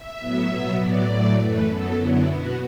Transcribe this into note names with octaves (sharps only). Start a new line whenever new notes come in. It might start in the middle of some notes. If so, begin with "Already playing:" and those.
Already playing: E5
A2 F#3 B3
B2 F#3 B3
A2 F#3 B3 D5
A2 F#3 A3
F#2 E3 A3 B4
F#2 F#3 B3 A4
F#2 D3 F#3 B3 E4
B2 B3 F#4